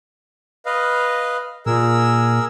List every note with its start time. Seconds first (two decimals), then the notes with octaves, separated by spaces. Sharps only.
0.66 B4 D#5 F5
1.66 A#2 G#4 A#4 E6